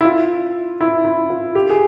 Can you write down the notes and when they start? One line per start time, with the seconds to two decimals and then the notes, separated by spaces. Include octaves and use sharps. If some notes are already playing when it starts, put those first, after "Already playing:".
0.01 E4
0.05 F4
0.81 E4
1.05 E4
1.30 F4
1.55 G4
1.70 G#4